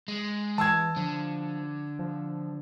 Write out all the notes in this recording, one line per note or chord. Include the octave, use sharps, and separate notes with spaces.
G#3
E3 A5 E6 G#6
D3 F3
F3